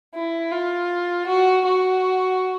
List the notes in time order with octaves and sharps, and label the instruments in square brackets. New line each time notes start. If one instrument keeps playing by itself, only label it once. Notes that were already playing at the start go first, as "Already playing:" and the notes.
[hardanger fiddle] E4
F4
F#4
F#4